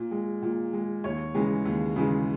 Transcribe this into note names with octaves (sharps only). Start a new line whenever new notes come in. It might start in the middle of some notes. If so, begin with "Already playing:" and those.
Already playing: A#2
G#3
A#2
G#3
D#2 C#5
C#3 E3 G#3
D#2
C#3 E3 G#3